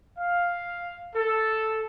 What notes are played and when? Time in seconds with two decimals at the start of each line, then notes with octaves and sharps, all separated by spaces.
0.18 F5
1.15 A4